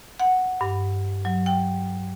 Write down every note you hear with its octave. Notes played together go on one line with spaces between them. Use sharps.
F#5
G2
F#3
G5